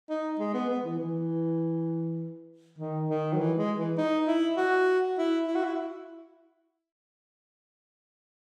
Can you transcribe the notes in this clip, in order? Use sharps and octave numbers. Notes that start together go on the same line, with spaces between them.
D#4
G#3
B3
B3
E3
E3
D#3
D#3
F#3
E3
G#3
E3
D#4
E4
F#4
E4
E4
F#4
E4